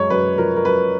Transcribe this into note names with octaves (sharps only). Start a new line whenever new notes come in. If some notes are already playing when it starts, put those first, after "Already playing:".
Already playing: F#2 G#3 C#5
F#2 B4
F3 A#4
A#4
F#2 B4